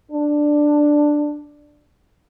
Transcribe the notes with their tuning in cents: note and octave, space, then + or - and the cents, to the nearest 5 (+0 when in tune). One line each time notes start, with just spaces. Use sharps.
D4 +5